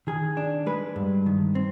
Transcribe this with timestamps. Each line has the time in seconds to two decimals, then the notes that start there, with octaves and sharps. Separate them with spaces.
0.07 D#3 G#4
0.37 D4
0.66 G#3 B4
0.96 G2
1.26 D#3
1.55 C4